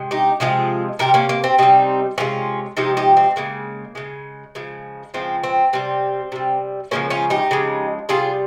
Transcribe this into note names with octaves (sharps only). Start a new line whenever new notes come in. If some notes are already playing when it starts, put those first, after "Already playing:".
Already playing: C3 G#3
D#4 G4
C3 F3 G#3 F4 G#4
C3 G3 G4 A#4
A#3 C#4
A#3
C4
C3 G3 C4 D#4
C3 F3 G#3 C#4 F4
C3 F3 G#3 D#4 G4
D#4 G4
C4
C#3 G#3 A#3
C#3 G#3
C#3 F3 G#3
C#3 F3 G#3 C4
C4
C3 G3 C4
C3 G3
C#3 F3 G#3 A#3 C#4
C#4 F4
D#4 G4
C#3 F3 G#3
C3 G3 F4 G#4